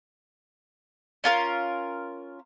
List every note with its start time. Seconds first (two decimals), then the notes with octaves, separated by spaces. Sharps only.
1.24 C#4 F4 A#4